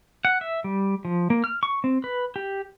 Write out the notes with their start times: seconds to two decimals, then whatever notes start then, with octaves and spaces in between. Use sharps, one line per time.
0.25 F#5
0.41 E5
0.64 G3
1.05 F3
1.30 A#3
1.44 F6
1.63 C#6
1.84 C4
2.04 B4
2.36 G4